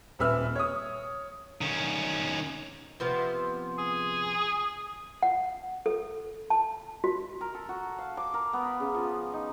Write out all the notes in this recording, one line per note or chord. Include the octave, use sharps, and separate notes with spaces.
D#1 C4 B4 E5 E6 F6
C#5 D#6
D#3 C#4
C3 F3 B3
G#4
F#5
A4
A5
F#4
A#4
A4
F#4
F5
D6
A#4
B3
B5
C#3
F3
D#4